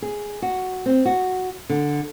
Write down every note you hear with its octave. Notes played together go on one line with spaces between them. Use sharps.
G#4
F#4
C4
F#4
D3